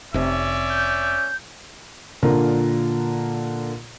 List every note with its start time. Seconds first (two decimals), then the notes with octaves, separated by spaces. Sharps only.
0.14 F1 C3 C#4 D5 E5
0.70 G6
2.23 A#2 D3 F4 A#4